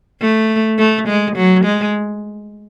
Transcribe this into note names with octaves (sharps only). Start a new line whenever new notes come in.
A3
A3
G#3
F#3
G#3